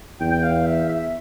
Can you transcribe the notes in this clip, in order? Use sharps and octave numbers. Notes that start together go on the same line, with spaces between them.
E2 G5
G5
F5
E5
E5